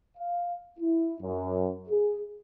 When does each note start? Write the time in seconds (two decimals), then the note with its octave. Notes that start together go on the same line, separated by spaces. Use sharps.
0.18 F5
0.79 E4
1.22 F#2
1.89 G#4